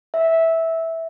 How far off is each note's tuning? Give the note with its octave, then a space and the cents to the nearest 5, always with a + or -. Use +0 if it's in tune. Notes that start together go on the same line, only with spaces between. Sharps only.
E5 -10